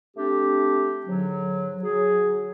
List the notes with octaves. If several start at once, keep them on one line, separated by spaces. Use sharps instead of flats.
A3 C4 D4 G4
G#2 D3 F#3
F#3 G#4